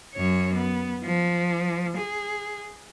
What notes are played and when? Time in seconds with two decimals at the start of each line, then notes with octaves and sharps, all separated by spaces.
0.14 F#2 C#5
0.55 B3
1.05 F3
1.97 G#4